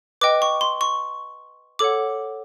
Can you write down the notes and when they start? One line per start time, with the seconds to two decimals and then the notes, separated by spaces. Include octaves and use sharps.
0.21 B4 D#5 G5 D6
0.42 C#6
0.61 C6
0.81 C#6
1.79 A4 C#5 F#5 D6